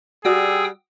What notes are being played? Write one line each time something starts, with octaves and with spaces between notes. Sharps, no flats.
G3 F#4 G#4 D5 G5 D#6 E6